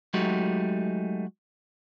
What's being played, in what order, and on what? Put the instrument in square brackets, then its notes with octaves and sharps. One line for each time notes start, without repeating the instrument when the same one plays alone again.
[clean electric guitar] F#3 G#3 A3 D#4 F#4 G4